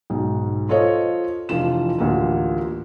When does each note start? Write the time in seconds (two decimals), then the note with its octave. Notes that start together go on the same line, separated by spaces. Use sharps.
0.10 B1 G#2
0.69 F4 A4 C5 C#5 D#5
1.49 F1 E3 D4 F4 E7
1.98 A1 D2 A#3 F4